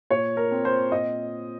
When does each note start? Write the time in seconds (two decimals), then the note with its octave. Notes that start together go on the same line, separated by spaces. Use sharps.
0.11 A#2 C#5
0.37 A#4
0.51 C4
0.65 C5
0.92 A#2 D#5